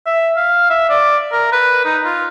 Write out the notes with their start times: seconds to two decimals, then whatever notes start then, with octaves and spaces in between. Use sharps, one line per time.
0.06 E5
0.36 F5
0.70 E5
0.89 D5
1.32 A#4
1.52 B4
1.85 D#4
2.05 F4